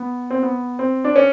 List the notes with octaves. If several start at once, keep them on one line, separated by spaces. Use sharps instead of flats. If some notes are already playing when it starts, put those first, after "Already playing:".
Already playing: B3
C4
B3
C4
D4
C#4